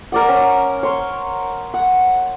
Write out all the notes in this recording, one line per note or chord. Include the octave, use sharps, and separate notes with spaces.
A#4 D5 F#5
C#4
C#5 C6
F#5